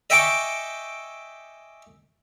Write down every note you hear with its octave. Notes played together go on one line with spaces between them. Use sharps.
D#5 E5 G5 G#5 C#6 D6